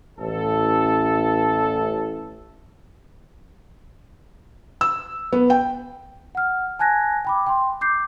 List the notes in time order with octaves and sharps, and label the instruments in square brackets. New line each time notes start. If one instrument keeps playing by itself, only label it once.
[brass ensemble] A1 A4
[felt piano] E6
B3
G5
[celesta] F#5 F6
G#5 A5 F#6 G#6 A#6
G5 B5 D6
G5 C6
D6 G6 C7